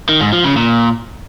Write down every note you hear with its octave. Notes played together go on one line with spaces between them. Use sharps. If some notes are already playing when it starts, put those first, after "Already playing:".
D#3
G#2
F3
C#3
A#2